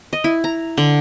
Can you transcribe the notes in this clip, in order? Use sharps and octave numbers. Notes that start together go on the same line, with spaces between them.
D#5
E4
A#5
D3